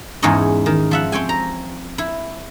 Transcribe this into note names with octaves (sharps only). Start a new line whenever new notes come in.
E2 G#2 C#4 E4 C#5 D#5
D#3
F3 E5 F#5
C4 C#5 G5 G#5
A#5
E4